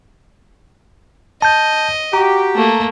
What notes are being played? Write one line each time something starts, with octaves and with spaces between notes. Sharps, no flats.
D#5 A5 G6
F#4 G4 A#5
A3 A#3